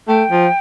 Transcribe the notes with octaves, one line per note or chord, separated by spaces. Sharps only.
A3 G5
F3